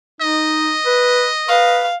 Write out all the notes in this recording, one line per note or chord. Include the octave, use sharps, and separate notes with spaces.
D#4 D#5
B4
B4 F5